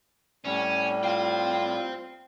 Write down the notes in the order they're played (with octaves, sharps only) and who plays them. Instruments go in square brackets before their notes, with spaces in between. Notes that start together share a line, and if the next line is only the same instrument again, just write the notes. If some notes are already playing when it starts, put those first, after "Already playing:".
[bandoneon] A2 G3 [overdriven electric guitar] C#4
[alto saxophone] F4 [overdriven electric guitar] C5 G5